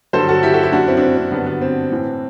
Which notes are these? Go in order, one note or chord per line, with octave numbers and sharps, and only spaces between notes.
G2 D3 F#3 A4 C5
F#4 A4
E4 G4
F#4 A4
E4 G4
F#2 F#3 D4 F#4
C4 E4
D4
C4 E4
C4
G2 D3 F#3 B3 D4
B3
C4
A2 E3